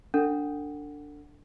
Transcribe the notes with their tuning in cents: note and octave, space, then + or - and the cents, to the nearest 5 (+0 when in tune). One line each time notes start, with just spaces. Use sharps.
D4 -5 A4 +35 F#5 +0